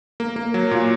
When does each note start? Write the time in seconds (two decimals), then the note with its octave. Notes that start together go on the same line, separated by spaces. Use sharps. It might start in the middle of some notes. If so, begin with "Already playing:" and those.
0.20 A#3
0.36 A#3
0.54 F#3
0.71 A#2